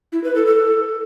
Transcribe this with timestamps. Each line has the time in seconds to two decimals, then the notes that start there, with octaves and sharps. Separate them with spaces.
0.12 E4
0.24 B4
0.35 A4
0.47 A4